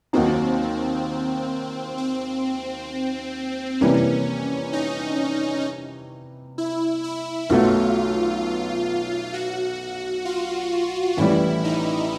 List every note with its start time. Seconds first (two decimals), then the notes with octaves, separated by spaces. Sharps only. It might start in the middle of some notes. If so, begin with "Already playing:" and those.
0.13 D#2 D#3 F#3 A#3 C4 D#4
1.98 C4
3.81 C3 E3 G3 A#3 C#4
4.73 D#4
6.58 E4
7.04 E4
7.49 B1 B2 F#3 A3 F4
9.33 F#4
10.25 F4
11.17 A1 A2 E3 G3 E4
11.64 D#4